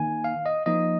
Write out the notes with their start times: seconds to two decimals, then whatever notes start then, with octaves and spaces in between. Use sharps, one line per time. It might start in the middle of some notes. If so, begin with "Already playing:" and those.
Already playing: D#3 A#3 D#4 G#5
0.24 F5
0.46 D#5
0.66 F3 A#3 D#4 D#5